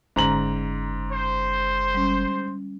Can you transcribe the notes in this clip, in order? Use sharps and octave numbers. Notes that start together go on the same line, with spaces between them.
F#1 G#2 D3 G#3 C#4 A#5 F#7
C5
G3 C#4